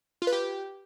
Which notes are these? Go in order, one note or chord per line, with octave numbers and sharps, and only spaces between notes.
F4
B4
G4